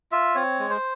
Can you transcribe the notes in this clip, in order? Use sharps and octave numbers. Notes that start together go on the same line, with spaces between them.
F4 E5
C4 C#5
G#3
C5